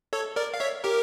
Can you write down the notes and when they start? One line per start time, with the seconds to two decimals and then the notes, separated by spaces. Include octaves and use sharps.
0.13 A4 C#5
0.36 A#4 D5
0.54 F5
0.60 C#5 E5
0.84 G4 A#4